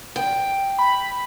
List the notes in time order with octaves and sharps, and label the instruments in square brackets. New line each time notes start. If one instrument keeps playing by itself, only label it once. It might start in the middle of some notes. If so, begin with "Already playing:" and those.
[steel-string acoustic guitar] G5
[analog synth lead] B5